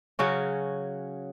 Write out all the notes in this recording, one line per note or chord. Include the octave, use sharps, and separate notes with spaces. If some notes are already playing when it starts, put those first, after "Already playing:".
C#3 F#3 C#4 F#4